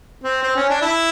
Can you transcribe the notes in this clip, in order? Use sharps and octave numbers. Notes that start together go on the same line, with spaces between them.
C4
C4
C#4
D4
E4